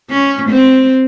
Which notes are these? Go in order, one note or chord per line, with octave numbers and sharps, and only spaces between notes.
C#4
C4